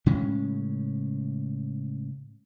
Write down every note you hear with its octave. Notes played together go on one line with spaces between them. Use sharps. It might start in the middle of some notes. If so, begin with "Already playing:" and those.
A2 C#3 G#3 C#4